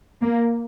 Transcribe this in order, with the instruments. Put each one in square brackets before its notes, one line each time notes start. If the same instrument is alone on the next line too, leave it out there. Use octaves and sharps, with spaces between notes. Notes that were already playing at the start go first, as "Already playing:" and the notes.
[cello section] A#3